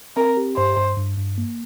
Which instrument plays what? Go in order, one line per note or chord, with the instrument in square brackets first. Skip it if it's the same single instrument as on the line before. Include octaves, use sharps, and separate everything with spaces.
[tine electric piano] C4 [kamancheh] A#4
[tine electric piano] G4
[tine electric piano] G2 [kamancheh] C5
[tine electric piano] G2
G2
G2
A#3